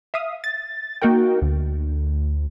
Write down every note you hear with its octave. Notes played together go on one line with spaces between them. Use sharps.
E5 F5 D#6
A6
A#3 D#4 F#4 A#4 G5
D2